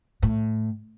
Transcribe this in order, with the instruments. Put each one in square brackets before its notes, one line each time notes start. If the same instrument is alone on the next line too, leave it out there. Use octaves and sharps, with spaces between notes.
[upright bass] A2